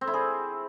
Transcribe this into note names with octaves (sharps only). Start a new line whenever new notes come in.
C4
E4
G#4